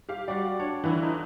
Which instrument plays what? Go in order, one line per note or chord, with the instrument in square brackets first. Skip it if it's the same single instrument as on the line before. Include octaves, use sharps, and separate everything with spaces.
[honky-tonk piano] G4 F5
[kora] G3 F#4 [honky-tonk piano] D5
[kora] D4 C#5
[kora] D3 E4 F4 [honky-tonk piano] E3
[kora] D#4